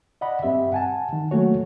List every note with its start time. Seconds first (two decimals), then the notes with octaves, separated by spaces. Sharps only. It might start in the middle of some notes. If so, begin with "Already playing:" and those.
0.21 D5 D#5 F#5 B5
0.43 G2 C4 G4 E5
0.72 F#5 G#5 A5
1.13 D#3
1.31 F#3 A3 A#3 F#4 C#5